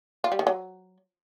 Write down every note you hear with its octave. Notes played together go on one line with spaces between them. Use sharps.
F4
G3
D#3
F#3